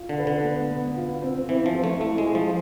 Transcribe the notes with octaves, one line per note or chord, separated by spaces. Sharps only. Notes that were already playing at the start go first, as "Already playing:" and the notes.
Already playing: F4
D3
B4
D3
B3
B3
F4
C4
E3 C4
F3
A4
A3
A3 E4
G#3
G#4
F3